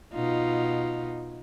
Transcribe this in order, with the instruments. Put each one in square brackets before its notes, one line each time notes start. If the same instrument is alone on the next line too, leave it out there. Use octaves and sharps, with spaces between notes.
[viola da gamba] B2 D#4 F4